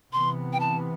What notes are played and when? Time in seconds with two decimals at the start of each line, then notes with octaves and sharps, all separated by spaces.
0.13 C3 E3 B3 C6
0.53 G5
0.60 A5